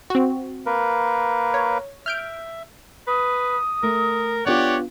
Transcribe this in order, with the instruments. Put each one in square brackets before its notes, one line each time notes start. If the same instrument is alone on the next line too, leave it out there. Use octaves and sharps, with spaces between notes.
[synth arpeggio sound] C4 F#4
[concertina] A#3 A#4 B4
[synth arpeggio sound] C#5
[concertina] E5 [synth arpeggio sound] F6 G6 D7
[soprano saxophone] B4 [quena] D#6
[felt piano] A3 [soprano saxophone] A#4
[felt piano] B3 D4 F4 [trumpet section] G4 C#5 F#5 [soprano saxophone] D5